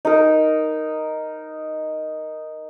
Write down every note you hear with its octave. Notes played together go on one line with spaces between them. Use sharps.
D#4 A#4